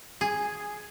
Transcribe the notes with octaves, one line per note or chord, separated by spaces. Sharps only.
G#4